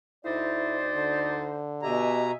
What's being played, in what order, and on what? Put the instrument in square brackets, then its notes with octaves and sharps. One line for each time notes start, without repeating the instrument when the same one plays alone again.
[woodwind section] D2 D#4 C5 [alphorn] E4 [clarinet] D5
[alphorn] D3
[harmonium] B2 A#5 [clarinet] G4 [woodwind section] D#5 E5 G#5